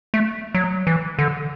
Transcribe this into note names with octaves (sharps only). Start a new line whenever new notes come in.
A3
F#3
E3
D3